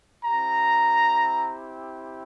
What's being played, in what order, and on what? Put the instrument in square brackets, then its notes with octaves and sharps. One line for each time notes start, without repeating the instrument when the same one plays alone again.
[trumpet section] C4 E4 G4 A#5